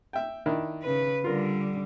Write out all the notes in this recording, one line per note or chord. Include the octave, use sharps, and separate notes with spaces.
E5 G5
D#3 D4 E4
C#3 B4
D3 G3 F4 A#4